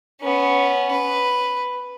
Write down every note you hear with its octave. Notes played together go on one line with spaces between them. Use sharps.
B3 C#4
B4